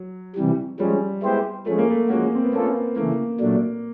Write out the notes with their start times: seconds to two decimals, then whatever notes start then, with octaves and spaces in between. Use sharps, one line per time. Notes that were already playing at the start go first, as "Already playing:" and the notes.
Already playing: F#3
0.35 C3 E3 G3
0.79 F3 G3 G#3 C#4
1.23 G#3 B3 E4 G4 C5
1.66 F3 G#3 A3 C#4
1.78 A#3
1.90 A3
2.09 F3 G#3 A#3 C#4 F#4
2.35 C4
2.44 B3
2.53 A3 A#3 C#4 F4 A4
2.96 C#3 E3 A3 A#3
3.40 A#2 F#3 A3 D4